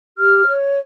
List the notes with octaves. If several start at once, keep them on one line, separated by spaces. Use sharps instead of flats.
G4 F6
C#5